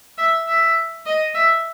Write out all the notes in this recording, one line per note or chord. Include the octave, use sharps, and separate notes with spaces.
E5
E5
D#5
E5